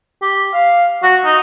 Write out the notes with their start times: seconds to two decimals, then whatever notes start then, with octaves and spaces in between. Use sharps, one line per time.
0.22 G4
0.53 F5
1.03 F#4
1.25 D#4